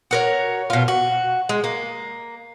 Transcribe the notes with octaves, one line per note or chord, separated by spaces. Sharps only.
F#4 A#4 C#5
B2 F4
F#4
G#3
A#3